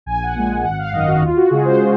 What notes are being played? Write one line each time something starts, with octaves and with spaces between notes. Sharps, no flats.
A#1 G#5
F#5
A#2 G#3 G#5
G#1 F#5
F5
F#2 D#3 D#5
F#4
D#2 F4
F#4
C#3 G#3 G#4
C5